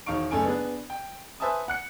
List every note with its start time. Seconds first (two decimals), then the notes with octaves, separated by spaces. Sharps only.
0.06 E1 D#3 F5 C#6 D7
0.31 F#1 A3 C#4 A4 G#5 D7
0.45 B3 D4 G#4 B4
0.90 G5
1.40 B4 C5 E5 G#5 A5 D#6
1.68 F#5 F#6 C#7